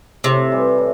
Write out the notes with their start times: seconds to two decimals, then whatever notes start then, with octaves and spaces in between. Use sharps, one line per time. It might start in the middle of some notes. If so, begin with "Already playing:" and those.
0.24 A2 C3
0.51 E3 G3
0.78 A2